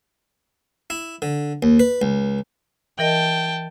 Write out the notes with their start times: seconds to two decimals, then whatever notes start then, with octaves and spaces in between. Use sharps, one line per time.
0.90 E4
1.22 D3
1.63 D#2
1.80 B4
2.02 C#2
2.99 E3 A#4 D#5 G5 A5